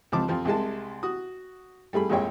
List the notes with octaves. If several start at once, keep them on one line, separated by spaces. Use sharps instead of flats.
C#2 F3 C4 A5 D6
F2 F3 C4
C2 C3 G#3 A5
F#4 D#6
G3 A3 G#4 B5
A#1 F2 G#3 C#5 G5